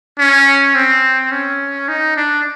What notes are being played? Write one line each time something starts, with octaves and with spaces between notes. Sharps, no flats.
C#4
C4
C#4
D#4
D4